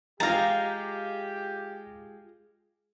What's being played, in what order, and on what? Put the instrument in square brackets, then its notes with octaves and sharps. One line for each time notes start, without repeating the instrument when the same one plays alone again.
[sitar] G#3 F4 [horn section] G4 [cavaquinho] F5 A#5 [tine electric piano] A6 A#6